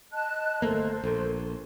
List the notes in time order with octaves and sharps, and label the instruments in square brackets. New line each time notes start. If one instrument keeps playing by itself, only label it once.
[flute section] D#5 A5 F#6
[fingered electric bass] G1 A3 A#3 [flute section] A4 A#4 C5
[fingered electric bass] A#1